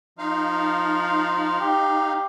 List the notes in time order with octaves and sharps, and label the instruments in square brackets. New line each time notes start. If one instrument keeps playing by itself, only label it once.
[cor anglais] F3 [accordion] D#4 F5
[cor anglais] G4
G4